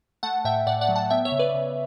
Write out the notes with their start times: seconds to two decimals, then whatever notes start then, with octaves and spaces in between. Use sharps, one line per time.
0.23 A3 F#5 A5
0.45 A2 E5 G5
0.67 A2 D5 F#5
0.81 D5 F#5
0.89 F#3
0.96 F#5 A5
1.10 B3 E5 G5
1.25 C#5 E5
1.32 C#3
1.39 B4 D5
1.54 C#3